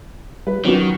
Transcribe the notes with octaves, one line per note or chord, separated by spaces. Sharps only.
G3 B4
D#3 F#3 B3 C#4 F#4